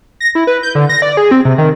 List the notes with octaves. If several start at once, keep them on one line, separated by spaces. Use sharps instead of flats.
A#6
E4
B4
G6
D3
A#6
D5
G#4
C4
C3
D#3